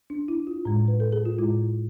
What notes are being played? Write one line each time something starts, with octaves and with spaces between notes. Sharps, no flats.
D4
E4
F4
A2 G#3
B4
A4
G#4
F4
A2 G#3 E4